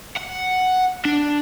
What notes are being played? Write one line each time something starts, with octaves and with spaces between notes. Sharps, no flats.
F#5
D4